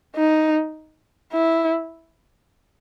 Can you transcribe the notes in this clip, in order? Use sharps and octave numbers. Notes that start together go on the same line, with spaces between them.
D#4
E4